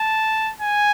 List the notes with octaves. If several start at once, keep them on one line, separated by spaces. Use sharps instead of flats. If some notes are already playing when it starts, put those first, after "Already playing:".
Already playing: A5
G#5